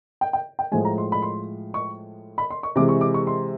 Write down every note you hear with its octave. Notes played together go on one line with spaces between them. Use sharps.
G5
G5
G5
A2 F3 G#3 G#5
A#5
C6
B5
C6
C#6
B5
C6
C#6
C3 E3 G#3 C4 D6
C#6
D6
C#6
C6